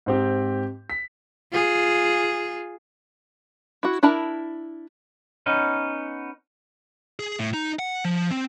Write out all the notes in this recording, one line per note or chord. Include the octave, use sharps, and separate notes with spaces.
G#2 C4 G4
B6
F4 G#4
E4 F#4
D4 E4 A#4 A5 B5
B3 C#4 D#4
G#4
A2
D#4
F#5
F3
C4